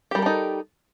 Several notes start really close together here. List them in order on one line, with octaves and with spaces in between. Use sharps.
G4 G3 A#4 A4 D#4